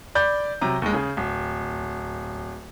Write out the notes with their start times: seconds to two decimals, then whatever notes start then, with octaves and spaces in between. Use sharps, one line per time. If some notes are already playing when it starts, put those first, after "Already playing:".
0.15 D5 B5 G6
0.61 C3 F#3 A#5
0.82 D#2 G#3
0.93 C#3 G#4
1.17 D1